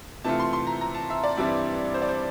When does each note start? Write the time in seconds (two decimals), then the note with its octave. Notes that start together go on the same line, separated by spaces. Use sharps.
0.24 C3 E3 A3 C4 F4 A5
0.40 C6
0.53 C6
0.67 A#5
0.81 A#5
0.95 A5
1.10 E5
1.23 D5
1.37 G2 E3 G3 C4 E4
1.94 C5
2.02 D5
2.09 C5